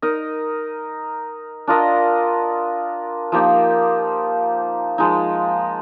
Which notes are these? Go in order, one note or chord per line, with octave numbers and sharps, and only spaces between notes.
D#4 A#4 D#5
D4 F4 A#4 D#5
F3 A#3 D#4 G4
F3 G#3 D#4